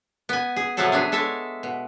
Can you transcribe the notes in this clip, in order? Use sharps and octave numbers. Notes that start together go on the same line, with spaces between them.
B3 G#5
G#4
C3 F3 F#3 E4 G#4 A4
B3 D4 G#4
G#3 A4 C#5 E5
B2